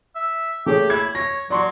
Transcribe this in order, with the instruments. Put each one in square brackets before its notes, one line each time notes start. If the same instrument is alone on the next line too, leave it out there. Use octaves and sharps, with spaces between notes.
[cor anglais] E5
[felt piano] A3 G#4 C#5 [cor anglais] G4
[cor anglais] E4 [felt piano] G#6
[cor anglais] C#5 [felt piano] A#6
[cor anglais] F#3 [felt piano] D5 C6 C#6